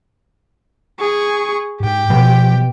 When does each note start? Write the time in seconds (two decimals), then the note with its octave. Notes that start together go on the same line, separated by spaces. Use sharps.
0.99 G#4 C#6
1.80 G#2 G4 G5
2.10 B2 F3